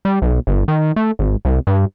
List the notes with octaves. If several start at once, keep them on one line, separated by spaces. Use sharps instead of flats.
G3
B1
G1
D#3
A3
G#1
C2
G2